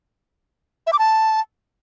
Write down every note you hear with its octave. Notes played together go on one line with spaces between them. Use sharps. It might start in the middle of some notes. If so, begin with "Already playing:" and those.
E5
D6
A5